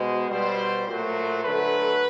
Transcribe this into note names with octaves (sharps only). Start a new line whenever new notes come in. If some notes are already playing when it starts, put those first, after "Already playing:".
Already playing: B2 G#3 C5
B2 G3 C5
A#2 F#3 A3 C5
D3 F#3 A3 B4